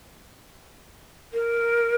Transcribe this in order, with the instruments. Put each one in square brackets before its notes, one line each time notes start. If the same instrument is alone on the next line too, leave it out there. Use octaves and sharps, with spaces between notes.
[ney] A#4